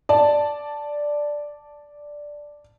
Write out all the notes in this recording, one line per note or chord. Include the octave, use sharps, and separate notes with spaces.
D5 A5